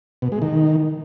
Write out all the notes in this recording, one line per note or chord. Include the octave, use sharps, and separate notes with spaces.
B2
G#3
D#3